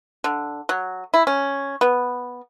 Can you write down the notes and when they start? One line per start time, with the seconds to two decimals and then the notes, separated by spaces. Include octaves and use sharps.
0.24 D3
0.69 F#3
1.14 E4
1.27 C#4
1.81 B3